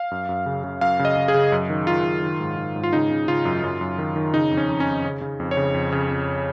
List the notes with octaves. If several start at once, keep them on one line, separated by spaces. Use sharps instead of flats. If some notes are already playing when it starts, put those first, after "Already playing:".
Already playing: F5
F#2
F#2
C#3
C#3
F#2 F5
C#3
D#5
C#3
G#4
C#3
F#2
D#3
D#3 F4
F#2
D#3
G#2
D#3
G#2
F4
C#3 D#4
C#3
C#3 F4
F#2
F#2
F#2
D#3
D#3
C#3 D#4
F2
C#4
F2
C#4
F2
C#3
C#3
F2
C#5
C#3
F2
C#3
F2